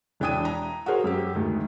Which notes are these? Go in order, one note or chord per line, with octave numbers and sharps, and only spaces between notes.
E1 E3 D4 G5 D#6 D#7
A#5
F#4 G#4 A#4 C5 C#5
F#2 G4
D2 G#2 D#3